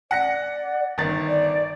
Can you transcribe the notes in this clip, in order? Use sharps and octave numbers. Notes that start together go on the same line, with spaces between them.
D5 F#5 A#6 C#7
G1 D#3 A6
D5